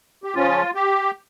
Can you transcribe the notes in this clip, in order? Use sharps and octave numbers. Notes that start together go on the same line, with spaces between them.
G4
C#3 F3 C#4 F4
G4